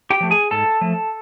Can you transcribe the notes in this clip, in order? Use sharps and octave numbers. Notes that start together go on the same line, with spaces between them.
G4 G5
F3 A3
G#4 G#5
G#2 A4 A5
F3 A3